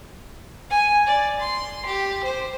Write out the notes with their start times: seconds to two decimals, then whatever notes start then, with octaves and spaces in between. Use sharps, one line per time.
0.70 G#5
1.07 D5
1.40 C6
1.86 G4
2.24 C5